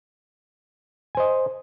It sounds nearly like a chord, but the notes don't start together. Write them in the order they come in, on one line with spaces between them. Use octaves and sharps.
G#5 C5 D#5